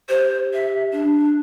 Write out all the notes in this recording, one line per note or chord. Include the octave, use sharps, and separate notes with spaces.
G4 C5
E5
D4